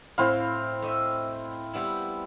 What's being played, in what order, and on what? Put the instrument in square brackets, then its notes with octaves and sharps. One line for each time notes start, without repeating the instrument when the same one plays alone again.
[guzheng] A2 [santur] C4 E4 F5
[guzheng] A3 D#5 E5
G3 B3 E4